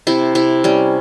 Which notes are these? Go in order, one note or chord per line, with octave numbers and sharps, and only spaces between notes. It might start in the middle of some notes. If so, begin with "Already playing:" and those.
C3 E4
C3 E4
G3 C#4